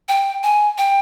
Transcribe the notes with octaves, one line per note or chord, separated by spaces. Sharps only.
G5
G#5
G5